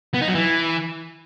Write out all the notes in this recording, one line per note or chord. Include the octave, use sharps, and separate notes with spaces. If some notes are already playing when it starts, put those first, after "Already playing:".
B3
D#4
F#3
E3